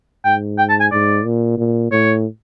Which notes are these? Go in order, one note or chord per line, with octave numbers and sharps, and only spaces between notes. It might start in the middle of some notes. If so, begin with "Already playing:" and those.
G#2 G5
G5
A5
G#5
G#2 D5
A#2
A#2
A2 C#5